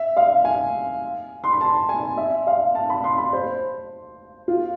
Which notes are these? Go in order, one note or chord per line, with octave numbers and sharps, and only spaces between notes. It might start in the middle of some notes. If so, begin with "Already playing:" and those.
Already playing: E5
F5
G#5
C6
B5
A5
G#5
E5
F5
A5
B5
C6
B5
C5
F4